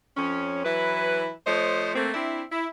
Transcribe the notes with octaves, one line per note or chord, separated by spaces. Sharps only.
F2 F3 C#4
E3 F#3 E4 B4
F3 A3 C5 C#5 D#5
A3 A#3 C4
C4 D4 E4
E4